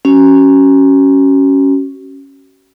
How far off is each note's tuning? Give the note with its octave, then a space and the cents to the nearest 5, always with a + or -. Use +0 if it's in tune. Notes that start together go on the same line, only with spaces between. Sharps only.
C#4 +0 F#4 +40